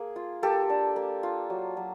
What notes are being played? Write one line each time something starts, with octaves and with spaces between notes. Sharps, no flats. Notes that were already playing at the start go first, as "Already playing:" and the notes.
Already playing: A#3 G#4
F4
A#3 G4 A4
D4
A#3
F4
F#3
F#3